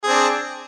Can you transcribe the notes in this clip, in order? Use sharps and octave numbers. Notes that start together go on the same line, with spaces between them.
C4 D4 G#4